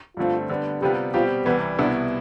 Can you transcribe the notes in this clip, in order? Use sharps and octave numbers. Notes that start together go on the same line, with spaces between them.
G2 D3 A3 C4 F4
D3 G3 B3
C3 G3 B3 F4 G4 B4
B2 G3 C4 F4 G4
C2 C3 E3 G3 B3
C2 B2 B3 D4 E4